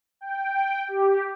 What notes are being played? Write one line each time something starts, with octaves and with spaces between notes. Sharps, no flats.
G5
G4